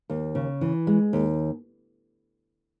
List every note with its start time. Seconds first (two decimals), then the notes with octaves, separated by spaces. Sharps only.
0.10 D#2
0.35 C#3
0.61 E3
0.87 G#3
1.13 D#2